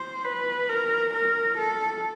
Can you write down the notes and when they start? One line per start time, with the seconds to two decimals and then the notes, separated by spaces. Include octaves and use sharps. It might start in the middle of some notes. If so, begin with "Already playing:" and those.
Already playing: C5
0.24 B4
0.69 A#4
1.14 A#4
1.57 A4